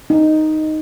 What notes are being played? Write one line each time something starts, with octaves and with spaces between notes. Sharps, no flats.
D#4